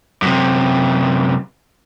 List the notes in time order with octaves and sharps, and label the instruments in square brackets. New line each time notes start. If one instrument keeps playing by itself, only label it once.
[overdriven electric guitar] F#2 C3